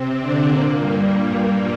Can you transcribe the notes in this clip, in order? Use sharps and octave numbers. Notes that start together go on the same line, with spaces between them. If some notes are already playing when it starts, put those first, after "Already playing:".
Already playing: C3 C4
D3 D4
A#2 A#3
G2 G3